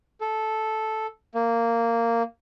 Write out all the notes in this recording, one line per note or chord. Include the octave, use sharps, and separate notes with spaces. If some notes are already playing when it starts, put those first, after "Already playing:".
A4
A#3